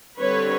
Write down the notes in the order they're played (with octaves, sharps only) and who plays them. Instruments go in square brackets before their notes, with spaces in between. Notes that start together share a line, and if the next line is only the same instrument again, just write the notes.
[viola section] D3 G3 C4 B4 C#5